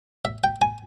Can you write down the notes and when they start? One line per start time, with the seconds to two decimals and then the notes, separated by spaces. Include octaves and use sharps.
0.25 E5
0.44 G5
0.62 G#5